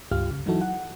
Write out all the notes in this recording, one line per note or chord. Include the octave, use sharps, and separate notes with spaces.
C#2 G2 F4 G4 F6
C#3
E3 F#3 D#4 E4 F#4 A4
F#5